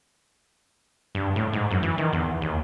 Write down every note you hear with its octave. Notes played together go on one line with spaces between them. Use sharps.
G2
A2
G#2
F#2
E3
D#3
E2
D#2